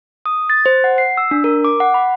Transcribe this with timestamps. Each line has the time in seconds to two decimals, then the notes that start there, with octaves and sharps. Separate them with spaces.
0.26 D#6
0.50 A6
0.66 C5
0.84 F#5
0.98 C7
1.17 E6
1.31 D4
1.44 A#4
1.64 D6
1.80 F#5
1.94 B5